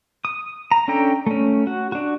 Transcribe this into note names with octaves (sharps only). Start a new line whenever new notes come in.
D#6
A#5
C#4 D4 A4 G5 A#5
A3 C#4
F#4
D4 F#4